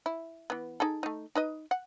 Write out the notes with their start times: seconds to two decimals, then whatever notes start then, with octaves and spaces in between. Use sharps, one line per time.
0.06 E4
0.50 E3 B3
0.80 D#4 G#4 A4
1.03 A3 D#4
1.35 D#4 B4 D#5
1.71 F#5